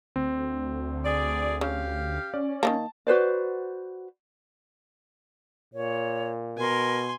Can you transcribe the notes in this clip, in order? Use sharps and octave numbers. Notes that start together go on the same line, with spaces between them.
D2 C4
G#4 D5
C#3 G4 F5
C#4 D5
D#3 E3 A#3 A5
F#4 B4 C5 D5
A#2 C#5
B2 A#4 G#5 C6